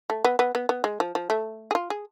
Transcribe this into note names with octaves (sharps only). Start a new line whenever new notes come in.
A3
B3
B3
B3
B3
G#3
F3
F3
A3
G#4
F4
G#4